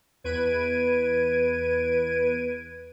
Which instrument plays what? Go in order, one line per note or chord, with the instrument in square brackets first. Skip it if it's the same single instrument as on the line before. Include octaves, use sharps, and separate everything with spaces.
[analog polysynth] E2 B4 G#6 D7 D#7